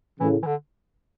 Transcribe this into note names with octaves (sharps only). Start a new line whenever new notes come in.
A2 C#3 E3
E3
D3